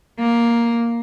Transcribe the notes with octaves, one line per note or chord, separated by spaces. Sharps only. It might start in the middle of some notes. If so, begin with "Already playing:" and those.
A#3